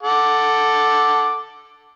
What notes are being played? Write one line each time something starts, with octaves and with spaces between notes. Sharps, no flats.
A4 F#5 D6